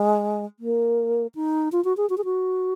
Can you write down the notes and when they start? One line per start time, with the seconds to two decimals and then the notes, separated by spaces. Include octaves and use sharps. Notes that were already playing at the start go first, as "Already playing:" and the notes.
Already playing: G#3
0.60 A#3
1.35 D#4
1.72 F4
1.85 F#4
1.97 G#4
2.10 F#4
2.18 G#4
2.25 F#4